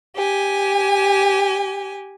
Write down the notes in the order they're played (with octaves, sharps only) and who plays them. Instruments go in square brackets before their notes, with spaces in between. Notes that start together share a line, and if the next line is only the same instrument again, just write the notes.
[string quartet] G4 G#5